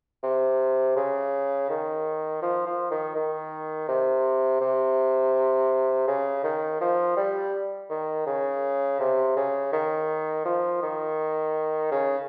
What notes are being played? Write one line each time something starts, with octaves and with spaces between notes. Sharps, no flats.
C3
C#3
D#3
F3
F3
D#3
D#3
C3
C3
C#3
D#3
F3
G3
D#3
C#3
C3
C#3
D#3
F3
D#3
C#3